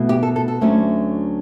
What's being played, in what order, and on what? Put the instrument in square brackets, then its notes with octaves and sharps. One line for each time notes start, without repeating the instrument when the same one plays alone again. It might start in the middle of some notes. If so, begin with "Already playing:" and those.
Already playing: [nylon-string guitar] B2 A3 E4
G4
A4
A4
A4
D2 D3 F#3 A3 C#4